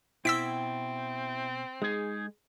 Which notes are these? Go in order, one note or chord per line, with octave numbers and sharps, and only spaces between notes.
B2 C4 E4 G5 E6 B6 D7
G#3 D#4 G#4